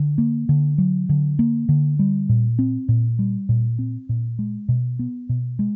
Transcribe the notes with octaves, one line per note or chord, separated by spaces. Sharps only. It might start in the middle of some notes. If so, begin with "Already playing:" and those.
Already playing: D3
A#3
D3
F#3
D3
A#3
D3
G3
A#2
C4
A#2
G3
A#2
C4
A#2
G#3
B2
B3
B2
G#3